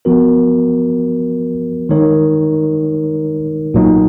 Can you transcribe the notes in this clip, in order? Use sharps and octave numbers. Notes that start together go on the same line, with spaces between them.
F3 B3 F#4 A#4
D#3 G#3 D#4 A#4 C#5
B1 A#2 F#3 A#3 D#4